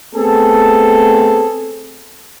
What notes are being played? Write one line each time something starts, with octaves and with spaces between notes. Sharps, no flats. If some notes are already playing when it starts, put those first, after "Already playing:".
A3 B3 C4 G#4 A4